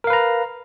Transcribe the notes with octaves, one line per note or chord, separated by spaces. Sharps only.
A#4 B4 F5 A#5